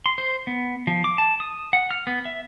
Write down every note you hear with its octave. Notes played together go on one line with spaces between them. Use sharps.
C6
C5
B3
F3
D6
A5
D#6
F#5
F6
B3
E5